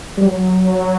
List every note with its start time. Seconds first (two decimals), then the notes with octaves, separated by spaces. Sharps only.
0.17 G3
0.26 F#3